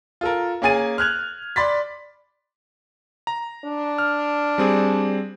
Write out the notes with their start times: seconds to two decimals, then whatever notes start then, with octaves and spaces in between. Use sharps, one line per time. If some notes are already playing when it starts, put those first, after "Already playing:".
0.21 F4 A4 A#4
0.62 A#3 C#4 G#4 G#5 A6 D#7
0.98 F6 F#6 G#6 F7
1.56 D5 B5 C6 A6 B6
3.27 A#5
3.65 D4
3.98 F6
4.58 G3 C4 G#4